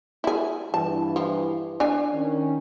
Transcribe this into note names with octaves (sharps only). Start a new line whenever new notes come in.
E4 G#4
G2 E3 A5
F3
D4 C#5 G#5
D#3 C#4